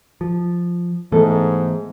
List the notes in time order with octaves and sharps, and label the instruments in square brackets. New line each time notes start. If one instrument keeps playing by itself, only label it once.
[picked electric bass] F3
[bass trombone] G#2 [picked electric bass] E3 A3 B3 [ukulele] A4